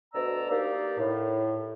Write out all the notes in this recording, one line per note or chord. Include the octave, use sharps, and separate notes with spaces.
D2 B2 D5 A#5 E6
A#3 D4 D#4 G4 D5
A2